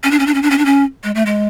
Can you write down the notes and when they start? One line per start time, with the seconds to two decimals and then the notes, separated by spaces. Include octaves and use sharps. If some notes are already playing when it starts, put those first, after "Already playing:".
0.04 C#4
0.11 D4
0.19 C#4
0.27 D4
0.34 C#4
0.43 D4
0.50 C#4
0.58 D4
0.65 C#4
1.03 G#3
1.15 A3
1.26 G#3